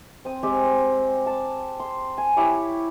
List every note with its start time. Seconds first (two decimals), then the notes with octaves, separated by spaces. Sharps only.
0.25 C4 D#6
0.43 G#3 C4 G4
1.26 A5
1.80 C6
2.18 G#5
2.37 E4 G4 C#5